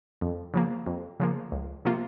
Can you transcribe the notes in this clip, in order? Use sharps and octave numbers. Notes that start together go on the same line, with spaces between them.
F2
C#3 F3 A#3
F2
C#3 F3 A#3
C#2
C3 F3 A#3 F4